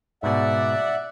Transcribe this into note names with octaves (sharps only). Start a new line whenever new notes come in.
G#2 B2 D5 E5 F#5